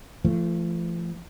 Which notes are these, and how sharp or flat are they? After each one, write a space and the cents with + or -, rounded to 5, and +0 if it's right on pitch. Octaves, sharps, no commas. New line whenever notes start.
F3 -40 A3 +0